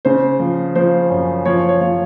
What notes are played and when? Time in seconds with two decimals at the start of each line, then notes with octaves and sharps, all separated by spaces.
0.05 C#3 C5
0.40 F3
0.75 F3 C5
1.10 F#2
1.45 F3 C#5
1.69 C#5
1.81 F3